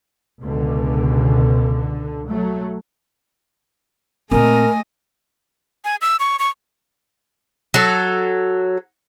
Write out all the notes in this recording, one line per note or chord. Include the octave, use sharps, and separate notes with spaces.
C#2 B2 D3
F#3 A3
A#2 A3 C4 A#4 D#5 G#5
G#5
E6
C#6
C#6
F#3 A4